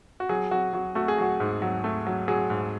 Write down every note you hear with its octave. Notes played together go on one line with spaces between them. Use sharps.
F#4
F#3 G#4
F#3 F#4
F#3 F#4
A3 F#4
G#4
F#3 F#4
G#2
F#3
A3
F#3
F#3 G#4
G#2